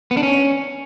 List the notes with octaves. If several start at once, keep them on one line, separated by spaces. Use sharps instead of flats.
B3
D4
C#4